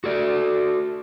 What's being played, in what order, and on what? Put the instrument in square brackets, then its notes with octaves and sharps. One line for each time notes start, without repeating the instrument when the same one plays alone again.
[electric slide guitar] F#4 A4 D5